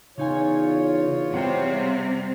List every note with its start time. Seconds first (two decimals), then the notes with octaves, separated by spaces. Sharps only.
0.18 E2 C#3 D#4 F4 C#5 G#5
1.34 C3 G3 C4 F#5 G5